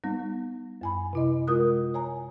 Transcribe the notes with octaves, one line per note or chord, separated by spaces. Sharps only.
G3 B3 D#4
F#2 G#5 B5
C3 E4 D#5
G#3 F4 A#4 D#6 F#6
C#5 G#5 A#5